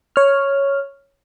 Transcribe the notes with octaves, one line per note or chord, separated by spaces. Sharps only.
C#5 F6